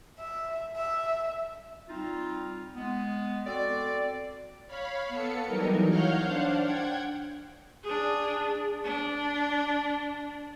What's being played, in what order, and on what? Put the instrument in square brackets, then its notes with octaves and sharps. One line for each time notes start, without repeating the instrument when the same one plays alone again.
[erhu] E5
E5
[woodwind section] G3 C4 D#4 F4
G#3 B3
C4 F#4 A4 D5
[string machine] C#5 F5 B5
B3 A4 C#7
E3 F#3 G3 D#4 A#4
C#5 F5 F#5 F6 G6
D4 C5 F5 F#5
F#5 G5 G#6
[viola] D4 G#4
D4